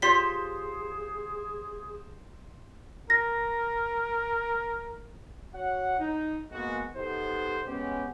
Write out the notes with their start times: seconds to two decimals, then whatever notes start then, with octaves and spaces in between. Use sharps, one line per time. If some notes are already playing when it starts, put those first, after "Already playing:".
0.02 F4 G4 G#4 C5 C#5 C6 B6
3.10 A#4 A#6
5.54 F#4 C#5 F#5
5.99 D#4
6.52 G#3 A#3 B3 F#4
6.95 B3 D#4 G4 A4 C5
7.67 G#3 B3 C#4 G4